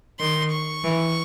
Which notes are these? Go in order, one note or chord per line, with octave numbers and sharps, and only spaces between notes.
D#3 C6
C#6
E3